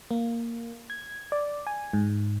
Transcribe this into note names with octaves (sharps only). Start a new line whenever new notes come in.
A#3
G#6
D5
G#5
G#2